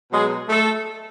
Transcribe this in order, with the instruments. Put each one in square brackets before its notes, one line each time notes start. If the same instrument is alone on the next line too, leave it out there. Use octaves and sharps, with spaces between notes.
[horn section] B2 F#3 G#3 G#4
A3 A4